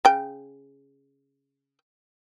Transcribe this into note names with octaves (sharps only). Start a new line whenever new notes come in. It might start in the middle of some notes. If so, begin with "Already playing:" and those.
C#3 G5